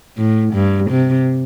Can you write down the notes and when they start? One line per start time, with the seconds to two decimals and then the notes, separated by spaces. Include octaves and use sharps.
0.17 A2
0.54 G2
0.90 C3